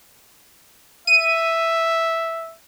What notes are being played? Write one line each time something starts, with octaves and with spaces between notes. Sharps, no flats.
E5 D#7